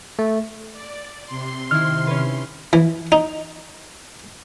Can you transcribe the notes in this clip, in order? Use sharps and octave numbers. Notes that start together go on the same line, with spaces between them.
A3
D5
C3 C6
D#3 E4 F6
C#4 B4
E3
D#4